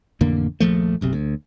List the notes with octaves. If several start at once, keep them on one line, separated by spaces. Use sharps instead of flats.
A1 F2 D3 A#3
D#1 A#1 F3 A3
F#1 B1 C3
D2